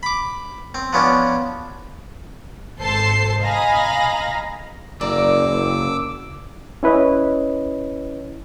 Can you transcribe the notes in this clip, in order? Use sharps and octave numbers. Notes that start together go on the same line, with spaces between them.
B5 D6
C4
F3 B3 C#4 D4
G#1 A4 C5 A5 C7
D#5 F5 G#5 A#5 B5 A#6
F#1 C#3 A#4 D5 D6 E6
C#4 E4 B4 C#5 D#5